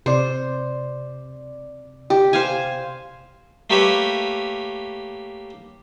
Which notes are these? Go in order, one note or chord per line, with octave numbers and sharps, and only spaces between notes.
C3 C5 D5
G4
C5 F5 G#5
A3 A#3 G4 B4 C#5 E5